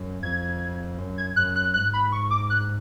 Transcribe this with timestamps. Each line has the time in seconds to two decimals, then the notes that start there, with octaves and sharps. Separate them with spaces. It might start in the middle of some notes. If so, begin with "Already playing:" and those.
Already playing: F#2
0.22 F2 G#6
0.98 F#2
1.18 G#6
1.36 F#2 F#6
1.56 F#6
1.74 G#2 F#6
1.93 B5
2.12 C#6
2.30 D6
2.50 F#6